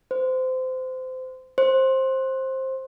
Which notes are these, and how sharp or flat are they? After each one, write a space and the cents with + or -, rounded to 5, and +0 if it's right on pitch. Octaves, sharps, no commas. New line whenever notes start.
C5 -25
C5 +15